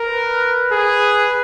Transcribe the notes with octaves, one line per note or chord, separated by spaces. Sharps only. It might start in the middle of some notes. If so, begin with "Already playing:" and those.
Already playing: A#4
B4
G#4